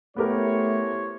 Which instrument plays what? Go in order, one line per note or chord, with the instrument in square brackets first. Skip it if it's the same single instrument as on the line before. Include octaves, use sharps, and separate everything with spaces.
[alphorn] A3 [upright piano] B3 G4 A#4 [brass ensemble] E4 C5 C#5